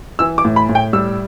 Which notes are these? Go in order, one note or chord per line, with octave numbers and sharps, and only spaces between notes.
E3 E6
D6
A2
B5
A2
G5
G3 E6